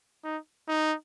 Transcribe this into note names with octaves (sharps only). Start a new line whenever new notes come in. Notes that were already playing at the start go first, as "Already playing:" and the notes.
D#4
D#4